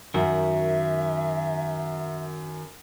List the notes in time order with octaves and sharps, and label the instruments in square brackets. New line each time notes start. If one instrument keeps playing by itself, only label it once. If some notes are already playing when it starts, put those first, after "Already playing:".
[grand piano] F#2 [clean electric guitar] D#3 F#4 A#4 [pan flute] E5